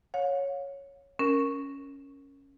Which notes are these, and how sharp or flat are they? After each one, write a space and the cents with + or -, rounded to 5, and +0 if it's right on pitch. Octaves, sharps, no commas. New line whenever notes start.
C#5 +0 F5 +40
C#4 +0 A#4 +0